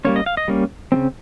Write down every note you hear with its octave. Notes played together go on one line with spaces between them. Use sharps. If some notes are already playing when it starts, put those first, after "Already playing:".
G3 A#3 C#4 C#5
D#5
F5
D#5
G3 A#3 C#4
C#3 G3 C4